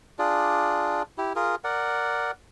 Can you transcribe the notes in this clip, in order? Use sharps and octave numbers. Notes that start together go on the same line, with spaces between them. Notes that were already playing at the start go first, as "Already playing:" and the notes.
D4 F4 G#4 D5
E4 G4
F4 G#4 A#4
A#4 D5 F#5